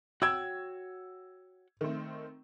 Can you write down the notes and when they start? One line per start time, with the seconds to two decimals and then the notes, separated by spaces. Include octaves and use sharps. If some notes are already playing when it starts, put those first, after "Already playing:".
0.22 F#4 C#5 G5 E6 G#6
1.81 D#3 A3 C4